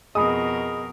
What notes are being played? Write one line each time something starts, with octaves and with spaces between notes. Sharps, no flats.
F2 B2 G#4 A#4 D#5 G#5 B5 D#6